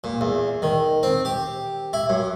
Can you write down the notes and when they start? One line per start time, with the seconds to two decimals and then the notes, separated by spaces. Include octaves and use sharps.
0.04 A#2
0.21 E2
0.62 D#3
1.03 C4
1.25 G4
1.93 E4
2.09 F#2